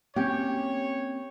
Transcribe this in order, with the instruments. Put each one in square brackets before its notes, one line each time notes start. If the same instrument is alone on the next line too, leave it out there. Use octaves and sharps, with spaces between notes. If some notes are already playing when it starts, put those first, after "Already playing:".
[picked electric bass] A#3 C4 C#4 [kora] G4 [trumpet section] C#5